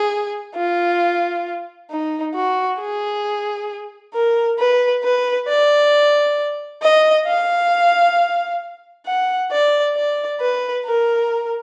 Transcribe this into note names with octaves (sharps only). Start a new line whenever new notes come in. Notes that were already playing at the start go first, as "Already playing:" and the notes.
Already playing: G#4
F4
D#4
F#4
G#4
A#4
B4
B4
D5
D#5
F5
F#5
D5
D5
B4
A#4